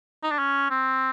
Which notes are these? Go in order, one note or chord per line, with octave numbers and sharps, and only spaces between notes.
D#4
D4
C#4
C4